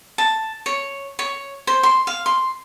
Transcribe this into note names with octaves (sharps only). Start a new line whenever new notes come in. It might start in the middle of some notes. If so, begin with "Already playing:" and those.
A5
C#5
C#5
C5
C6
F5
C6